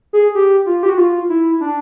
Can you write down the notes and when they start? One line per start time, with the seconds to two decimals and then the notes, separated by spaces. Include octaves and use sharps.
0.13 G#4
0.35 G4
0.66 F4
0.83 G4
0.89 F#4
0.98 F4
1.29 E4
1.60 D4